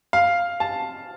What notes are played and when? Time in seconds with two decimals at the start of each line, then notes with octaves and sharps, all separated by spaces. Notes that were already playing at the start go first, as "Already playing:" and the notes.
0.13 F5
0.60 A5